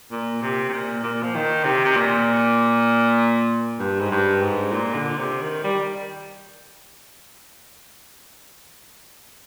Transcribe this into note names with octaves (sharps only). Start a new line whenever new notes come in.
A#2
C3
C3
A#2
A#2
F3
D#3
C3
C3
A#2
G2
G#2
G2
G#2
A#2
D3
C3
D#3
G3